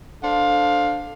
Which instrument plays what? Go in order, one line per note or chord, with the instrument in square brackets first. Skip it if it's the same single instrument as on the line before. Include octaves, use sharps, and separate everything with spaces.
[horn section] D4 A4 C5 F5